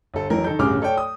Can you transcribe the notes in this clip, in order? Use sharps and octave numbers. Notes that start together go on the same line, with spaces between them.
G1 A4
F2 E3 F#3 A#4
D#3 A4 G6
D1 G2 C#3 G#4 D6 F6
A4 C#5 D5 G5
D#6